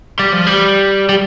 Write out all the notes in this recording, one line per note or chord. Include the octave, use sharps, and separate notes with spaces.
G3
F3
G3
G3